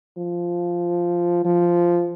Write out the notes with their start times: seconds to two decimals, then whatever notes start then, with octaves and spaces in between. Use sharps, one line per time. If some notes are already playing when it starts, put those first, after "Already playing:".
0.18 F3
1.45 F3